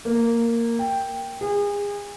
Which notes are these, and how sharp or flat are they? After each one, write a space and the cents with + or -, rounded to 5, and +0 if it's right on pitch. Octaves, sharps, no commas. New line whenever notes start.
A#3 -5
G5 +5
G#4 -35